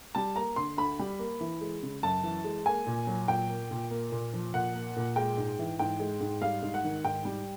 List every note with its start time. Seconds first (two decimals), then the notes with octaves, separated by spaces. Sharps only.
0.15 G3 A5
0.36 A#3 A#5
0.56 D3 C6
0.77 D2 B5
0.99 G3
1.19 A#3
1.41 E3
1.61 G#3
1.83 C#3
2.03 F#2 A5
2.24 E3
2.44 G#3
2.66 A#3 G#5
2.87 A#2
3.07 F#3
3.28 A#2 G5
3.49 A#3
3.71 A#2
3.91 A#3
4.12 A#2
4.34 F3
4.53 A#2 F#5
4.75 A#3
4.96 A#2
5.16 G#3 G5
5.37 G#2
5.59 E3
5.79 G#2 G5
6.00 G#3
6.21 G#2
6.41 G3 F5
6.62 G#2
6.74 F#5
6.84 D#3
7.05 G#2 G5
7.25 G3